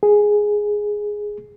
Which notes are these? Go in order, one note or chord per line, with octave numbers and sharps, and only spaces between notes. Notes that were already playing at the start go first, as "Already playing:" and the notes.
G#4